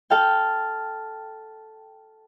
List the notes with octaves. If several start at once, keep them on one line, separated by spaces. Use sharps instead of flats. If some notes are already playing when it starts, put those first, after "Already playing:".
A4 F5 G5